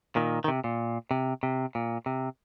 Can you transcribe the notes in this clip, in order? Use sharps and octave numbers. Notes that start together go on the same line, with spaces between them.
A#2 D#3
D#3
C3
A#2
C3
C3
A#2
C3